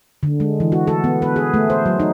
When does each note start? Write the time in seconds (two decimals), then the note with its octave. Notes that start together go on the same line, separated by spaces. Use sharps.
0.23 D3
0.40 G#3
0.60 E3
0.72 F#4
0.87 A4
1.04 B3
1.22 B4
1.36 G#4
1.54 A3
1.70 C5
1.86 F#3
2.00 D#4